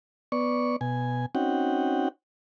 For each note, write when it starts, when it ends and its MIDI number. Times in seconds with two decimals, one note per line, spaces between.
0.32 0.76 59
0.32 0.76 74
0.32 0.76 85
0.81 1.26 47
0.81 1.26 80
1.35 2.08 60
1.35 2.08 61
1.35 2.08 63
1.35 2.08 66
1.35 2.08 78
1.35 2.08 79